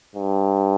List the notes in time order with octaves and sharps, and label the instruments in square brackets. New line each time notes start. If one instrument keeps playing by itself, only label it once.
[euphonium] G2